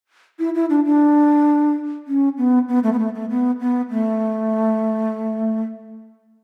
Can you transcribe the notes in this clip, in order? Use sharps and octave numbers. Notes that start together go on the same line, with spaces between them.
E4
E4
D4
D4
C#4
B3
B3
A3
B3
A3
A3
B3
B3
A3